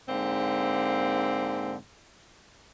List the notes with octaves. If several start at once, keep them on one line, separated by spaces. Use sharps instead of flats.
G#2 D3 A#3 C4